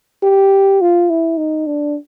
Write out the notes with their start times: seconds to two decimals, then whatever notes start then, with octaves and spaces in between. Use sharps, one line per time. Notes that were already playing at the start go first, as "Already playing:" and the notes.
0.23 G4
0.81 F4
1.10 E4
1.38 D#4
1.67 D4